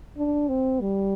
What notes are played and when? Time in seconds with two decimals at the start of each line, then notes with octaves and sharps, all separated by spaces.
0.17 D4
0.49 C4
0.80 G3